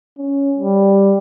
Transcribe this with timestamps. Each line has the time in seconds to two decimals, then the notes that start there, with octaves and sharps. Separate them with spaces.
0.18 C#4
0.57 G3